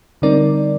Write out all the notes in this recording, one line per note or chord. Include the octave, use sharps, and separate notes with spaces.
D3 G3 C4 D#4 A#4 D5